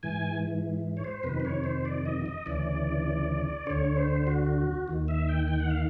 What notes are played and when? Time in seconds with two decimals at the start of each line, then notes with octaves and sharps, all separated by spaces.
0.03 G#2 E3 G#5
0.97 C#5
1.04 C5
1.23 F2 C3 D#3 B4
1.40 C5
1.45 C#5
1.64 C5
1.85 D5
2.06 D#5
2.26 D#5
2.46 D2 C#3 E3 D5
3.67 D2 D3 C#5
3.97 C5
4.27 F#4
4.88 D#2 D#3
5.08 E5
5.29 G5
5.48 G5
5.60 F#5
5.70 F5